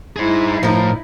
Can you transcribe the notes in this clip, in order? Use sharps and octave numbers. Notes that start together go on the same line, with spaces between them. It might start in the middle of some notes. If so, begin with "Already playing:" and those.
G2 D#4 E4 G#4 C5
A2 F3 A#4